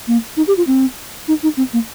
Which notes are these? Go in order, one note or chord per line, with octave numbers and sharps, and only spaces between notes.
A#3
D#4
G4
F4
C4
D#4
D#4
C4
A#3